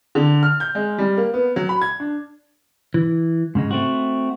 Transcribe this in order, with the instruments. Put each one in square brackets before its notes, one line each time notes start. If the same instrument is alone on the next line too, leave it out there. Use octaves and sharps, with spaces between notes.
[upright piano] D3
F6
G6
G#3
G3
A#3
B3
F#3
B5
G#6
D4
[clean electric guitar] E3
G#2 C#3 G#3
A3 C4 F#4